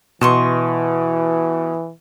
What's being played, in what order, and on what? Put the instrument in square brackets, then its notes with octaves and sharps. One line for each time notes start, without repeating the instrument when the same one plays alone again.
[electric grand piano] B2 E7 [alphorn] E3 [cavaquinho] D#5 C6 C#6